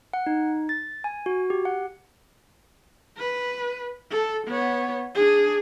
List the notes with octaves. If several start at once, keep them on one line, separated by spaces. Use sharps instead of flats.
F#5
D#4
A6
G#5
F#4
G4
F#5
B4
A4
B3 C#5
D4 G#4